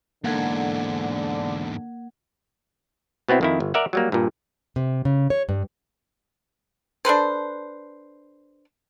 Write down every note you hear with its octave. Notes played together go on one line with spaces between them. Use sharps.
E2 G#2 D3 A#3 F#5 G#6
B2 B3 C4 E4
F2 D#3 E4
G1
A#4 D5 E5 F#5
F#3 G3 A#3
G2 A#2
C3
C#3
C#5
G2
D4 A4 B4 C5